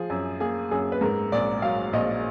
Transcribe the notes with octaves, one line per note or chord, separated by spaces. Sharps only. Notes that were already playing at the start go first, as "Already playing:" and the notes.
Already playing: F3 G#4
F#2
A#3 G#4
F#2 G#4
B4
G#2 A#4
A#1 D5
F#3 F5
A#1 D#5